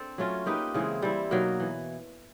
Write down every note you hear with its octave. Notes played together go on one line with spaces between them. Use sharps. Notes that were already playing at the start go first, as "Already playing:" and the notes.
Already playing: C4 D4 A4
F#3 A3 C#4 F4
A#3 D#4 G4 B4
C#3 E3 G#3 C4
G3 C4 E4
B2 F#3 A#3 D#4
E3